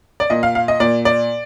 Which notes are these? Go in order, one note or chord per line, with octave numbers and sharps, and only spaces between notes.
D5
A#2 D#5
F5
F5
D#5
A#2 D5
D5